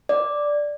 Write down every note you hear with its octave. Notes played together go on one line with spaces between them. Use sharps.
D5